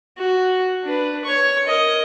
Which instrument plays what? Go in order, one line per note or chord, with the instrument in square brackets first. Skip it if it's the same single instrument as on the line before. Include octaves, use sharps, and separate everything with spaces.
[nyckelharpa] F#4
D4 B4
C#5 C#6
A#4 D#5